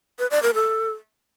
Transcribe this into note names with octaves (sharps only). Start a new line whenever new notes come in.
B4
D5
A#4
A4